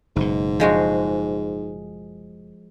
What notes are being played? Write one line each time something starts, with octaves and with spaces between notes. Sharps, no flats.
F#1 G#2 B2
F3 G#3 F#4